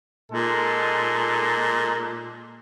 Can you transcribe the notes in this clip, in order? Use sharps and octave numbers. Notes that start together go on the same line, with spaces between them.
A#2 G#3 D#4 A4